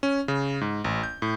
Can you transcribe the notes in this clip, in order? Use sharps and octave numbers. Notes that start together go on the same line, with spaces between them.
C#4
C#3
G#2
A1
G6
A2